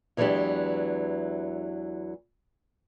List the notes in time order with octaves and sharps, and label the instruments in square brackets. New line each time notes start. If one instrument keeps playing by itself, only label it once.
[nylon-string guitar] E2 E3 F#3 G#3 D4 G4